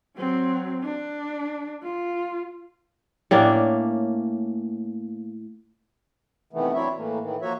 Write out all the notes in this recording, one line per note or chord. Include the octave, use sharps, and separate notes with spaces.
F#3 C4
D4
F4
A2 A#3 C#4 D4
C3 D#3 E3 A3 B3
F#3 C4 D4 E4 C#5 E5
A2 E3 A3 A#3
A2 D#3 E3
F3 A#3 F#4 C#5 E5